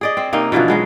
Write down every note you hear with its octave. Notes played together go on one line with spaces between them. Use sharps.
G#4 D5 D#5
C4
C3 A#3 C#4 D#4
B2 D3 E3 F3
F#3 G#3 B3